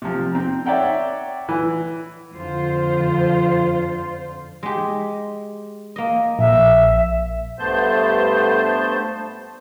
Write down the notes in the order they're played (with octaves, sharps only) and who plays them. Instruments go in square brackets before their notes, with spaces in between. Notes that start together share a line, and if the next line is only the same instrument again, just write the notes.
[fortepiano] C3 F3
C4 A#5
C#5 D5 E5 F#5 G5 A#5
E3
[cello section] F2 D3 F4 C5
[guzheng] G#3 G4
A#3 D#5
[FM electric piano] A#1 [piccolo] E5
[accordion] G2 A3 B3 C5 A5 G6